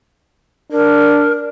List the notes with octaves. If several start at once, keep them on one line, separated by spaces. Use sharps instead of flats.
D4 A#4